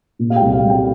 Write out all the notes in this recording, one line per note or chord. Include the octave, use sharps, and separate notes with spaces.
A#2
F5
G5
C2
F5
G3
G5